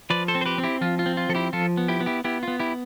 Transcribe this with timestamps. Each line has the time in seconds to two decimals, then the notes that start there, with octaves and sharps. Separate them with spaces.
0.10 F3 B4 D5
0.28 A4 C5
0.35 C4
0.41 C5
0.46 G4 B4
0.58 C4
0.64 E4 G4
0.81 F3 F4
0.99 F4
1.06 C4
1.17 F4
1.29 F3 A4
1.35 E4 G4
1.53 F3 F4 A4
1.77 B3
1.88 E4 G4
2.00 B3
2.06 E4 G4
2.24 B3 E4 G4
2.43 B3 F4
2.59 E4 G4